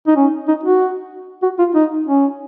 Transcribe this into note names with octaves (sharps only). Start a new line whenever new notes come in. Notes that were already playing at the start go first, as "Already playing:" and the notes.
D#4
C#4
D#4
F#4
F#4
F4
D#4
C#4